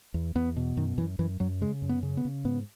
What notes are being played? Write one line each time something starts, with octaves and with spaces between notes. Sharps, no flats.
E2
E2 B3
B2
F#2 D#3
F#2 E3
F#2 E3
F#2 F#3
C#3 G#3
F#2
B3
C#3
B3
C#3
G#2 B3